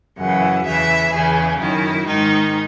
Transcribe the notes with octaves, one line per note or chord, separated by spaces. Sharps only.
F#2 C#3 E3 F#5
E2 C#3 E3 E5
E2 C#3 E3 G#4
F#2 D#3 E4
G#2 D#3 D#4